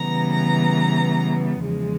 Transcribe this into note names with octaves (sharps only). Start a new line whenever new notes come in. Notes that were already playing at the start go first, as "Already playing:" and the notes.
Already playing: C#3 E3 G3 B3 A#5
A#5
E2 C#3 F3 G#3